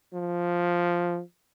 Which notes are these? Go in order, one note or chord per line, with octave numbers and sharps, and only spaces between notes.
F3